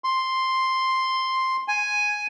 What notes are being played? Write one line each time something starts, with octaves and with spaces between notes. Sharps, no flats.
C6
G#5